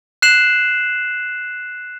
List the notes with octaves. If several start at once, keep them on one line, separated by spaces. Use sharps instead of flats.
F#6 C7 E7 F#7